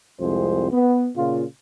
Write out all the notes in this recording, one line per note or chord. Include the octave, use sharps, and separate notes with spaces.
C2 F2 G#3 C5
B3
A#2 C#3 F4